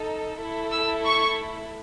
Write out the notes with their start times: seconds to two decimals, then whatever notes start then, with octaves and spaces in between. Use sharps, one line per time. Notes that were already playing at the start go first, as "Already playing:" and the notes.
Already playing: D#4 A4
0.40 A3 E4 A4
0.73 E6
1.06 C#6